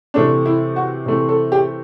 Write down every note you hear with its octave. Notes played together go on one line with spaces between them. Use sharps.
C3 E3 A3 C4 D4
E4
F#4
C3 E3 A3 C4
A4
G4